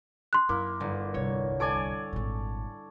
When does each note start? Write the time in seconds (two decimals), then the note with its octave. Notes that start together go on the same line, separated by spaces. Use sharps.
0.33 C6 F#6
0.49 F#2 A#3 E4
0.80 G1
1.14 D1 C2 C#5
1.60 A4 C#5 D5 G#5 D7
2.13 G#1 A#2